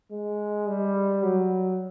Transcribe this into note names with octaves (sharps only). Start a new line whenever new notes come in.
G#3
G3
F#3